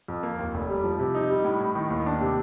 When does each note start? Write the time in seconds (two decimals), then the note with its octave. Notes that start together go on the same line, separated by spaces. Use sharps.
0.08 F2
0.23 A#3
0.39 D#2
0.54 F1
0.69 G3
0.84 F3
0.99 C3
1.15 D#4
1.30 G3
1.45 A2
1.61 A2
1.75 D#3
1.90 D#2
2.06 D4
2.21 C3